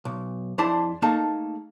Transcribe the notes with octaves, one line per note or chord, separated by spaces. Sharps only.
B1
F2 D4 E4 G#4 C5 A5
A3 A#3 D#4 G#4 A4 A5